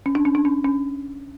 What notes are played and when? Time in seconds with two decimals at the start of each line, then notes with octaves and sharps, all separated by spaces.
0.06 C#4
0.15 D4
0.25 C#4
0.35 D4
0.45 C#4
0.64 C#4